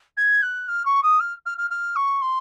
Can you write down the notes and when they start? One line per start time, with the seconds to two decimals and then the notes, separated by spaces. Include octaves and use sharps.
0.17 G#6
0.42 F#6
0.68 F6
0.85 C#6
1.03 D#6
1.20 F6
1.46 F6
1.58 F6
1.70 F6
1.96 C#6
2.21 C6